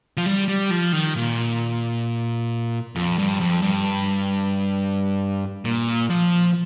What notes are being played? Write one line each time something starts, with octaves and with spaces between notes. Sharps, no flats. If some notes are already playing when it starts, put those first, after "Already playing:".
F3
G3
G3
F3
D#3
A#2
F2
G2
F2
G2
A#2
F3